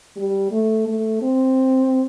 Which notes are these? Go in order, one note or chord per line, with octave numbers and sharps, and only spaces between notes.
G3
A3
A3
C4